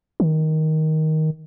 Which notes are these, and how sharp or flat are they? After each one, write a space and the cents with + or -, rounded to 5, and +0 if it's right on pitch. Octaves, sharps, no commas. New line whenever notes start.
D#3 +10